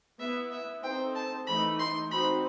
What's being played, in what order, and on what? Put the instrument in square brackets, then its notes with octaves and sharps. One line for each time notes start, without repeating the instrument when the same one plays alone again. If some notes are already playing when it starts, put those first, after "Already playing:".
[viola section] B3 E4 B4 [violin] E5
[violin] E5
[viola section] C4 D#4 A4 C5 [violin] G5
[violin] A5
[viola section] E3 A3 D#4 A4 [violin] B5
[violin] C6
[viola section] C4 D#4 F#4 C5 [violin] B5